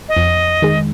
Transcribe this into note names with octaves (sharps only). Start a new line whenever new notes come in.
D#5
F2
D#3 G#3